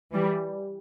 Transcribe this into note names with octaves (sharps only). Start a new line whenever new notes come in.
E3 G3